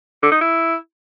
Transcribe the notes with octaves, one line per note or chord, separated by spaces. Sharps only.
D3
D#4
E4